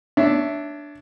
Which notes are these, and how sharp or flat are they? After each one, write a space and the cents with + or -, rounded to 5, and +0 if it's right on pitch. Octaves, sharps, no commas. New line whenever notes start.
D4 +0 C#5 +25 E5 +0